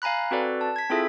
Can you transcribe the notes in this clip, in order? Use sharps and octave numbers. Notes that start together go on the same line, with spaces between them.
F5 G#5 A#5 B5 F#6
C4 F#4 A4 B4 D5
A5
G#6 B6
C4 E4 F4 G#4 A4 E5